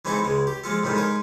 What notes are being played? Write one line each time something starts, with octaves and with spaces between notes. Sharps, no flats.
E3 G#3 C4 D#4 E4 A4
C#2 G#3
G4
F3 G#3 F4 A4
A2 C3 D#3 G3 G#3
G#3 D#4 A#4